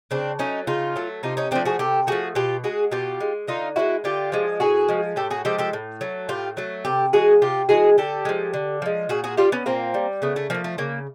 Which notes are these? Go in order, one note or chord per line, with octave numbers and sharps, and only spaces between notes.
C#3 C4 D4
F#3 A3 C#4 D#4
C#3 D#4 F4
F#3 A3
C3 D#4 F4
C#4 D#4
F3 A3 C4 D4
F#4 G#4
C3 G4 A4
F3 A3 F#4 G#4
B2 F4 G4
G#3 F#4 G#4
B2 F4 G4
G#3
D3 D#4 F4
F3 G#3 E4 F#4
D3 F4 G4
F3 G#3
A2 F#4 G#4
F3 G#3
A2 G4 A4
F#4 G#4
F3 G#3 G4 A4
G4 A4
A2
F#3 A3
A2 F4 G4
F#3 A3
C3 G4 A4
E3 G#3 F#4 G#4
C3 F4 G4
E3 G#3 F#4 G#4
D3 G4 A4
F3 G#3
D3
F3 G#3
A#2 F#4 G#4
F#4 G#4
G3 F4 G4
B3 C#4
A#2 A#3 C4
G3
C#3 A3 B3
A3
F3 A3 A#3
A3
C#3 A#3